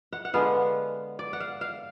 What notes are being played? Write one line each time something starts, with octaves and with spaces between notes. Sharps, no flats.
F#5
F#5
D3 G#3 B3 F5
D5
F#5
F5
F5